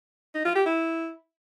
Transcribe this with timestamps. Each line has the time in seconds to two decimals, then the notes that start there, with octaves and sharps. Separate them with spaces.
0.34 D#4
0.45 F4
0.55 G4
0.66 E4